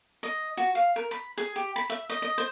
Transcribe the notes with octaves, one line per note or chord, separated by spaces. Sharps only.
D#5
F#4
F5
A#4
B5
G#4
G4
B5
E5
D#5
D#5
C5